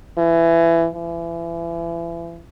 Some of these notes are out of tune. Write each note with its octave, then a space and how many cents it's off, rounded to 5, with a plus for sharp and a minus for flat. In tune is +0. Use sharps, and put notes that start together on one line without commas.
E3 +20
E3 +35